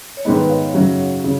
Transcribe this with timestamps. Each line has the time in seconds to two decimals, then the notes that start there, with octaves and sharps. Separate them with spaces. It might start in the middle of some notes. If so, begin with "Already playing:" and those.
0.17 C#5
0.25 G#2 D#3 G#3 B3 D#4 B4 D#5
0.49 C#5 F5
0.73 F#2 C#3 F#3 C#4 F#4
1.24 C#3